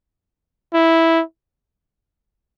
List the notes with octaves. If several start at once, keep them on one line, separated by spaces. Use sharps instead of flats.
E4